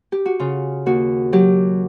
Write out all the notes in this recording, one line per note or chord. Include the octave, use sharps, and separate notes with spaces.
G4
F#4
C#3 F4
D#2 F#4
F#3 G4